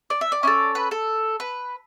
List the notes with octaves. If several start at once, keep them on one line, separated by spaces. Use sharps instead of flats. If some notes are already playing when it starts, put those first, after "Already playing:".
D5
E5
D5
C#4 E4 A4
B4
A4
B4